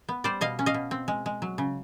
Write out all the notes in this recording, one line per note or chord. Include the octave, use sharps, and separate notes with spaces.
B3
G3 C5 D5
B2 D#5 F5
C#4
D#5 F5
B2
C4
G#3
G#3
F#3
C#3